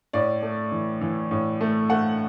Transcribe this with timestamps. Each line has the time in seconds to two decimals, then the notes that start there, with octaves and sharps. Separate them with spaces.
0.13 A2 D5
0.43 A3
0.72 E3
1.01 E3
1.31 A2
1.61 A3
1.90 A3 F#5